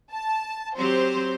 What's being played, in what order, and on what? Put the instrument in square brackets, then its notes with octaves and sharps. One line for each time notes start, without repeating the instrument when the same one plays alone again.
[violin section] A5
[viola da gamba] F#3 C4 G4 [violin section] C5